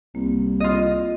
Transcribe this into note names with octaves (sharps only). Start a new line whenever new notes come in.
C2 A#3
F4 D#5